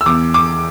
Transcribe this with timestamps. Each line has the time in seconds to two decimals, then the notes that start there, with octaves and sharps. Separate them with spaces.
0.01 E6
0.06 E2 D6
0.34 D6